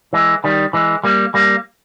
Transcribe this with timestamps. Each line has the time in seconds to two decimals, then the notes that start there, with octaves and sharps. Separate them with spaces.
0.13 E3 G#3
0.44 D#3 G3
0.73 E3 G#3
1.04 G3 A#3
1.34 G3 A#3